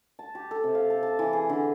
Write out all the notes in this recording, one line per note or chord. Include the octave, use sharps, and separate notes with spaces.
A5
G4
A4
C3
F5
A4
A5
E3
G#4
D3